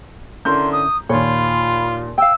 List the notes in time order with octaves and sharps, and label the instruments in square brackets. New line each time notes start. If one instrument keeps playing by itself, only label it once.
[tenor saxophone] D3 [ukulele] C#4 E4 A#4 [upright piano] A#5 G6 [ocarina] C6
[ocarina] D#6
[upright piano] D#2 A#2 [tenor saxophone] F4 [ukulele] C#5 [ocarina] B5
[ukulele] F5 G5 [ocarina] E6